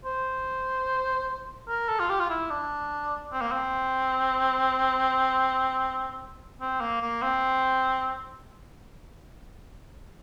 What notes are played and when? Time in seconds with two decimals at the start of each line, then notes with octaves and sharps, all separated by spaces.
0.05 C5
1.68 A#4
1.89 A4
2.00 F4
2.09 G4
2.20 F4
2.30 E4
2.50 D4
3.32 C4
3.42 A#3
3.51 C4
6.61 C4
6.81 A#3
7.01 A#3
7.22 C4